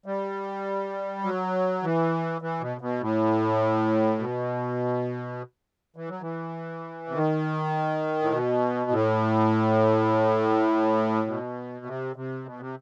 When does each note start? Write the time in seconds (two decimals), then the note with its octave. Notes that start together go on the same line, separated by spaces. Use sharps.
0.06 G3
1.24 F#3
1.83 E3
2.42 E3
2.61 B2
2.81 B2
3.01 A2
4.18 B2
5.96 E3
6.09 F#3
6.22 E3
7.08 C3
7.14 D#3
8.22 A2
8.32 B2
8.91 A2
11.27 B2
11.86 C3
12.16 C3
12.46 B2
12.60 C3